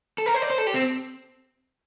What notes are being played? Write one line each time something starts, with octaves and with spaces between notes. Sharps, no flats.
A4
A#4
C5
D5
C5
A4
G4
C4